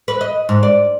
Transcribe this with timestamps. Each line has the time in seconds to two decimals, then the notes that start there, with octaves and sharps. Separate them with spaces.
0.08 B4
0.21 D#5
0.49 G#2
0.63 D5